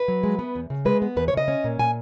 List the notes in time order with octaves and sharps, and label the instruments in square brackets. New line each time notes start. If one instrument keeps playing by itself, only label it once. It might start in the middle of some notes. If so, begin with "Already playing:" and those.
Already playing: [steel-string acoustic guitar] B4
F#3
G#3
B3
E2
C#3
G#3 B4
B3
E2 B4
C#5
C#3 D#5
C#4
A#2
A#2 G#5